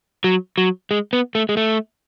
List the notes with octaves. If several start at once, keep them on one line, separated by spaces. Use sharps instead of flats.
F#3
F#3
G#3
B3
A3
G#3
A3